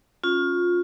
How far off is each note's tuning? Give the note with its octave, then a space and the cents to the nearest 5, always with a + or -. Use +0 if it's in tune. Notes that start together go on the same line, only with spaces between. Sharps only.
C#4 -5 F4 +20